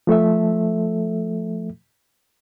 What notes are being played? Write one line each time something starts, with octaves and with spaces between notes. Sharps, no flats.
F3 A3 A4 E5